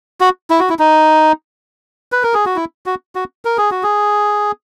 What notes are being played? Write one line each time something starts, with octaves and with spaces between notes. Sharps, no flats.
F#4
E4
F#4
E4
D#4
B4
A#4
G#4
F#4
E4
F#4
F#4
A#4
G#4
F#4
G#4